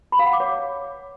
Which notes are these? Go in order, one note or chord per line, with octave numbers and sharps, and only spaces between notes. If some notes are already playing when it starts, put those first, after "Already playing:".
B5
F5
F#5
D6
C#5